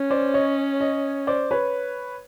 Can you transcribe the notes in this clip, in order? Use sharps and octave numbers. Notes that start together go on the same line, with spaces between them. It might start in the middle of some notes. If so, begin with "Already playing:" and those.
Already playing: C#4
C5 D5
C#5 D#5
C#5 D#5
C5 D5
B4 C#5